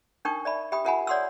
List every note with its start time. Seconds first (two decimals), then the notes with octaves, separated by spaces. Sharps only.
0.25 D4 D#4 A#4 G5 C#6 D#6
0.45 D5 E5 B5
0.72 G4 E5 G5 B5 D#6
0.85 F4 A#4 E5 F#5 G#5 B5
1.07 C#5 D5 F#5 C6 D#6 E6